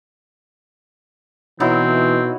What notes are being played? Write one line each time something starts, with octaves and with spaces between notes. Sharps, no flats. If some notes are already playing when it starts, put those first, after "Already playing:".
B2 E3 F#3 C4 D#4 E4